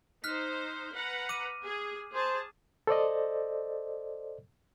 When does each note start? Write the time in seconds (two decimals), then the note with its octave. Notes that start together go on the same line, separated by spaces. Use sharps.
0.24 D#4 C5 F6 F#6 B6
0.94 B4 F#5 A#5
1.29 D6 D#7
1.65 G#4
2.14 G#4 C5 A5
2.87 A4 C5 D5 D#5